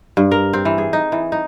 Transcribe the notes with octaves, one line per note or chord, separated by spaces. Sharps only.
G2
A#4
C4
E3
G#4
D#4
E3
D#4